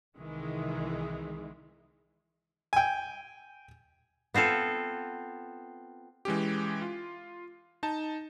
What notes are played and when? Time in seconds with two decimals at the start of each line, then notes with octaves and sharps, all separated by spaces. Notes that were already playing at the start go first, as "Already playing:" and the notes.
0.17 C2 D#3 E3 G#3
2.73 G5 G#5
4.34 B3 C4 F4 A4
6.25 E3 G#3 C#4 G4
6.82 F4
7.83 D#4 A5